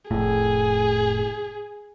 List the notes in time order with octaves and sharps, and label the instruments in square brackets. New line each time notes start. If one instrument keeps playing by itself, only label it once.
[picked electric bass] F1 A2 [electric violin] G#4